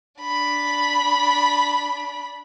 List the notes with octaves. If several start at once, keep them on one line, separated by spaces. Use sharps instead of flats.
D4 B5